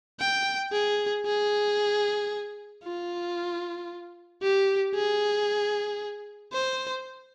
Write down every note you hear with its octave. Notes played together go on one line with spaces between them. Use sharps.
G5
G#4
G#4
F4
G4
G#4
C5